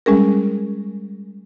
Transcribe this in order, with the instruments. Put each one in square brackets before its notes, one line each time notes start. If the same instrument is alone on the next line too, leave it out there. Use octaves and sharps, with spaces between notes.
[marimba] G3 G#3 C#4 G#4 A#4